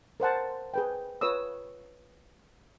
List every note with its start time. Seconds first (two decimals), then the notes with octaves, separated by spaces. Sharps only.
0.20 A#4 C5 F#5 A5
0.74 G#4 B4 G5
1.21 F4 B4 C#5 D#6 E6